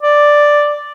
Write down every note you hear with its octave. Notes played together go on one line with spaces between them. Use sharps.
D5